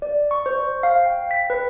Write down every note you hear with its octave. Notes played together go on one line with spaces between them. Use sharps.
D5
C#6
C5
F5
G5
B6
B4